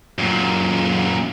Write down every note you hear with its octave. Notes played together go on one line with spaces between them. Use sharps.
F#2 A#2